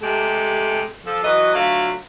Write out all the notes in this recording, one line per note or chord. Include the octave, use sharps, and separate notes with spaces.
C3 G#3 A3 G4 A4
F3 A4
E3 F#3 F#4 B4 D#5
D3 F#3 A3 F4 E5 F5